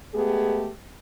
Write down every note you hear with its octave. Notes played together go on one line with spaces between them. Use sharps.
G#3 A3 B3 G4 G#4